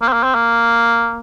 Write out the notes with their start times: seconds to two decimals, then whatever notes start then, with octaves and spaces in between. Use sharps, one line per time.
0.02 A#3
0.08 C4
0.13 A#3
0.24 C4
0.35 A#3